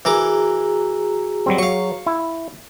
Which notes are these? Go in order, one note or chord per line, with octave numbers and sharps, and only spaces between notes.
E3 F#4 G#4 A#4 A#5 D6
F#3 G3 C4
F#3 F5 C#6
E4